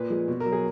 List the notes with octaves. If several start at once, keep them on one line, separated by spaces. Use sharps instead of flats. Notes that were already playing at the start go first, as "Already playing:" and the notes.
Already playing: A#2 B4
F3 G#3
B2
A#4
F#3
G#4